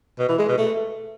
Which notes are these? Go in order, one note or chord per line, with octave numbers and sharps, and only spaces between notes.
B2
E3
G#3
B2
A3